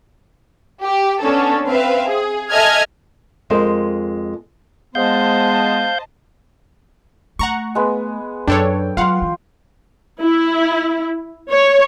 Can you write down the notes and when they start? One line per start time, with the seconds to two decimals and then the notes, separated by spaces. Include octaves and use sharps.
0.85 G4
1.21 B3 C#4 D4 A4
1.67 C4 B4 E5 F5
2.08 G#4
2.52 A4 D#5 E5 G#5 F6 G#6
3.50 F2 G#3 A#4 C5
4.95 G#3 B3 C5 D#5 F5 A5 G6
7.39 A3 F#5 A#5 C#6
7.75 G#3 B3
8.48 F#2 D4 A4 C#5 G5
8.97 F#3 F4 F5 F#5 C6
9.22 E3
10.20 E4
11.51 C#5